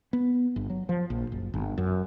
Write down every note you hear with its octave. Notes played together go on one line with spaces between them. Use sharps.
B3
G1
F#3
F3
A#1
F#1
G1
F#2